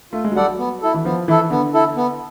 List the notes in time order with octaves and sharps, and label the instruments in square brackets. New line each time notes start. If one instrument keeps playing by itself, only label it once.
[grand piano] A3 [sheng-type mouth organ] F4
[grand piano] G#3
F#3
[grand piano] G3 [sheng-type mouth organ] A4 D5 F#5
[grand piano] F#3
[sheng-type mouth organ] B3
E4 A4
[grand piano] E3
[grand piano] F3 [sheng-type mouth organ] B3
[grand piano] E3 [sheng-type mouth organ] E4 A4
[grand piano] D3 [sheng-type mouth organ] B3
[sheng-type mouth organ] E4 A4
B3